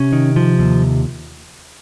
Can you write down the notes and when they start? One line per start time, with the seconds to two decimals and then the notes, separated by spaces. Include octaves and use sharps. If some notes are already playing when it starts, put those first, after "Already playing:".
Already playing: C3 C#4
0.12 D#3
0.36 F3
0.59 D#2